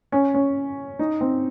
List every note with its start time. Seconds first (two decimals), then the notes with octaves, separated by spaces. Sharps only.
0.12 C#4
0.34 C#4
0.99 D#4
1.21 C4